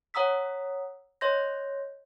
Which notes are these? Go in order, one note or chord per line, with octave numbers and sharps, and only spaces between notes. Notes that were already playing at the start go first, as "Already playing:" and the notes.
C#5 F#5 A#5 D#6 E6 B6
C#5 D#5 C6 G6 A#6